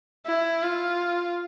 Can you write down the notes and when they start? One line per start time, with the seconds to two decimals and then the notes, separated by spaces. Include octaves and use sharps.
0.27 E4
0.63 F4